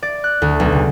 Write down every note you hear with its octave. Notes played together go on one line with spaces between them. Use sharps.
D5
F#6
D2
B1
C#3